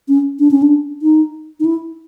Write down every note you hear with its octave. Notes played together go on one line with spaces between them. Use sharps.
C#4
D4
C#4
D4
D#4
D#4
E4